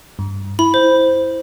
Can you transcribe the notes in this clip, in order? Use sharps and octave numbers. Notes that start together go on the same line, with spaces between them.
G2
E4 B5
C5